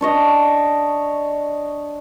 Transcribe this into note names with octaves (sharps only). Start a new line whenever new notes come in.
D4 C#5 D#5